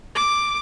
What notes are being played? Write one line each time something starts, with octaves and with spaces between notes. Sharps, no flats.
D6